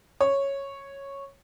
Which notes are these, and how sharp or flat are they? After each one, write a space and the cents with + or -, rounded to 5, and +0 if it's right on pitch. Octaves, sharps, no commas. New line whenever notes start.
C#5 -5